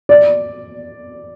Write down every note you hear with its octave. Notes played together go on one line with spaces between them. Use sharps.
D5